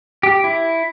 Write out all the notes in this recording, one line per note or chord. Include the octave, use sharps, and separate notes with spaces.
G4
E4